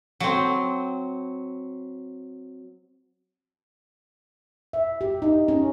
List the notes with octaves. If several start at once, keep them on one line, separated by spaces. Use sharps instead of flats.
F#3 C4
E5
G4
D#4
C#4